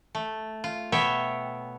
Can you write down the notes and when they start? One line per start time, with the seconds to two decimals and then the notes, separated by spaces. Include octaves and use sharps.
0.15 A3
0.64 F4
0.92 B2 B3 C#5 E5 G5